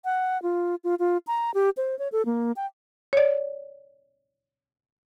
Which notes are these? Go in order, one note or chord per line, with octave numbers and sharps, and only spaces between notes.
F#5
F4
F4
F4
A#5
G4
C5
C#5
A4
A#3
G5
C#5 D5